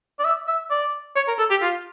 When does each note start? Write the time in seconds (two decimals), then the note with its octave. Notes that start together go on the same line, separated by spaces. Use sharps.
0.19 D5
0.25 E5
0.48 E5
0.70 D5
1.16 C#5
1.28 A#4
1.39 A4
1.50 G4
1.62 F4